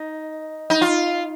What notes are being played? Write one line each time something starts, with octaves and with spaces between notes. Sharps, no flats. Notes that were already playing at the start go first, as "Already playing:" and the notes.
Already playing: D#4
D#4
F4